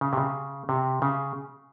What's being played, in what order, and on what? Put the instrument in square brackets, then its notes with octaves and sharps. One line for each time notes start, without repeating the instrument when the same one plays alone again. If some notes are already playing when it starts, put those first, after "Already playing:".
[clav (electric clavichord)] C#3
C3
C#3
C3
C#3